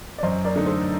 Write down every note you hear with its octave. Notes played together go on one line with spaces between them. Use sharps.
D5
F#2 C5 D#5
A#4 D5
D3 A3 D#4
A4 C5